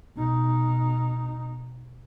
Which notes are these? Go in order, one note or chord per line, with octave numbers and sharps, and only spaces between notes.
B2 D#4